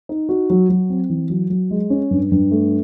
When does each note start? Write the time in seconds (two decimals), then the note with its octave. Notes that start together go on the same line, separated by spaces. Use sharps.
0.09 D#4
0.29 F#4
0.50 F#3
0.69 F#3
0.90 C4
1.10 E3
1.30 F#3
1.50 F#3
1.71 G#3
1.90 C#4
2.11 G2
2.32 G2
2.51 A3